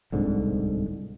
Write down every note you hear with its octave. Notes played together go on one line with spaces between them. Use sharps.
D1 C2 G#2 D3